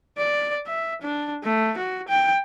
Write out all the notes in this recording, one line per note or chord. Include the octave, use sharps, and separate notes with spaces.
D5
E5
D4
A3
F#4
G5